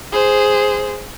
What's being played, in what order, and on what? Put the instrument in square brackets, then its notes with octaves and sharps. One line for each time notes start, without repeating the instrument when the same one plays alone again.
[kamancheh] G#4 C5